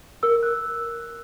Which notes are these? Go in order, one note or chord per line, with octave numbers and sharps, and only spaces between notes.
A#4 E6
F#6